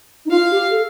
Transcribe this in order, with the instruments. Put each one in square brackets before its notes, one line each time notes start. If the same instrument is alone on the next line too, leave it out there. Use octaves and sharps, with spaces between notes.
[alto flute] D#4
[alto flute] F4 [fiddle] F5
[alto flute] G4
A4